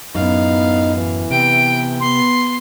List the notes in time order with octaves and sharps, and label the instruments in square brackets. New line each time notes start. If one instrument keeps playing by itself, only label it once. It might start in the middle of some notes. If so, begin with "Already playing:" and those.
[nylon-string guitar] F#2 A2 [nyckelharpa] B3 F5 [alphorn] D#4
[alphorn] E3
[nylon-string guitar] C3 [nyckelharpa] B3 G5 [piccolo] D7
[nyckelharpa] B3 [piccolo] C6